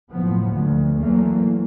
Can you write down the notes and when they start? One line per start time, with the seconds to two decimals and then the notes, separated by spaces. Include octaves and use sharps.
0.12 F#1 A2 F3 B3
0.50 D2
1.00 E2 E3 F#3 A3 A#3